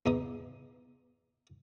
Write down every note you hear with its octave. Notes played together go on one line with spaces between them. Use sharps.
E2 D#4 D#6